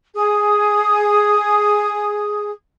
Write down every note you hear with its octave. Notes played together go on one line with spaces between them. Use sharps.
G#4 D#6